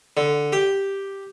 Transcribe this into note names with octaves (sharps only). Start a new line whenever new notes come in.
D3
G4